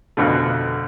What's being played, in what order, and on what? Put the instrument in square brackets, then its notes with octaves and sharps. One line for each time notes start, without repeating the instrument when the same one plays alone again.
[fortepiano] F2 B2 D3 A3